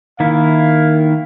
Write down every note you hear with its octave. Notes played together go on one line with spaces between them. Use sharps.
D#3 A#3 E4 F5